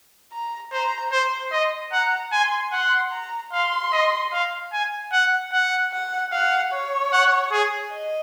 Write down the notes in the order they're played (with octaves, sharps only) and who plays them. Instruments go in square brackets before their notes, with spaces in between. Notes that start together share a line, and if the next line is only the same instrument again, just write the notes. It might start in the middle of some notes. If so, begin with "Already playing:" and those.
[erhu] A#5
[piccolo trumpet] C5 [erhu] A#5
[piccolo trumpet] C5 [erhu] C6
[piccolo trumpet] D#5
[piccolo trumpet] F#5 [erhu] A#5
[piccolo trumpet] G#5 [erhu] C6
[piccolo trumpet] F#5 [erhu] C6
[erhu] A#5
[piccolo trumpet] F5 [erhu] C6
[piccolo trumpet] D#5
F5
G#5
F#5
F#5
[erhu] F#5
[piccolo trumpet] F5 [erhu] F#5
[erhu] C#5
[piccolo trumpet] F#5
G#4
[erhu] D#5